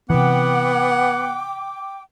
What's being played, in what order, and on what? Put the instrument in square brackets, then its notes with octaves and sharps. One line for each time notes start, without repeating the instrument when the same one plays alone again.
[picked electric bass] C3 E3 [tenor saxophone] B3 [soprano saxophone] F#5 [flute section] G5 D6